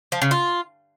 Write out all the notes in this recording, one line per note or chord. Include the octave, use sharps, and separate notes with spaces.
F3
C#3
F4